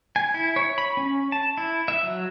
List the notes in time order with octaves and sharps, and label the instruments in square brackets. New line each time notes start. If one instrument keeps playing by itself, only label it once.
[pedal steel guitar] G#5
E4
C#5
B5
C#4
A5
E4
E5
F#3